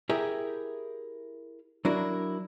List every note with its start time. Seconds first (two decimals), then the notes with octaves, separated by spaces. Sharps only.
0.09 E4 G4 G#4 A#4 E5
1.85 F#3 D4 E4 F#4 A#4